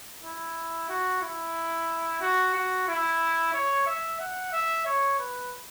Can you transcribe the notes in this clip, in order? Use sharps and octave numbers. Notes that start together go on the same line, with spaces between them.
E4
F#4
E4
F#4
F#4
E4
C#5
E5
F#5
E5
C#5
B4